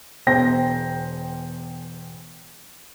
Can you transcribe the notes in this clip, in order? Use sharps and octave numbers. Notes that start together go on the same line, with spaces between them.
E1 E2 C5 G5 A#6